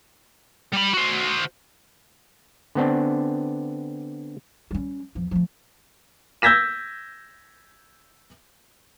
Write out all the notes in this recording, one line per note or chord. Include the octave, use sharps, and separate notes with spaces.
G3 B5
F#4 C5
D3 B3 C4 D4
G3 C#4
E2 F3
F3 A3
E6 G6 G#6 A#6 B6 E7